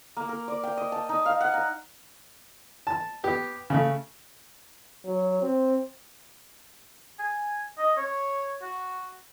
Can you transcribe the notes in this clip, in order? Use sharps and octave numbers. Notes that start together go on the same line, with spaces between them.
A#3
A#4
D5
G5
D#5
A5
D#4
F5
F#5
A#5
A5
B3 G4
C#3 A3
F#3
C4
G#5
D#5
C#5
F#4